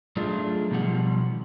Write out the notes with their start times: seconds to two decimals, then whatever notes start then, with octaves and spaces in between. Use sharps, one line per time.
0.17 F#3 A3 D4 D#4 F4 G#4
0.71 B2 D#3 F3 G3 F#5